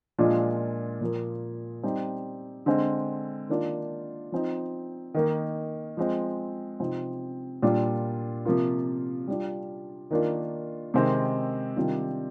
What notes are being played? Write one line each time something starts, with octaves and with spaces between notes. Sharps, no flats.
A#2 F3 G#3 D4 F4
A#2 F3 A#3
G3 C4 D#4
D3 G#3 C4
D#3 A#3 D4 F4
F3 C4 D#4
D#3 A#3 D#4
F3 G#3 C4
C3 F3 C4 D#4
A#2 G3 D4 F4
C3 F3 A#3 F4
G3 D4 F4
D#3 A#3 D4 F4
C3 D#3 G#3 C4
C3 D#3 G3 D4 F4